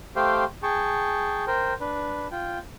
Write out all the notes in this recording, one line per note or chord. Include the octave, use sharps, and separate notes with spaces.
A3 G4 C5 F5 G5
G#4 G5 A5 C#6
A#4 C5 G5
D4 B4
F4 G5